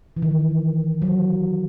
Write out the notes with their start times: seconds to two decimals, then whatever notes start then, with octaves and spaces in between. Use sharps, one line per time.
0.17 E3
0.22 D#3
1.02 F#3